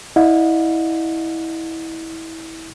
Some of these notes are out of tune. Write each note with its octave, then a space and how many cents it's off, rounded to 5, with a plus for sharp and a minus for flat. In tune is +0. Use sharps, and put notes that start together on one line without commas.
E4 -25 D#5 -35 F#5 -45